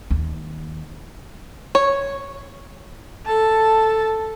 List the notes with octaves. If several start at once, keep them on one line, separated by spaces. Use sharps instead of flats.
D#2
C#5
A4 A5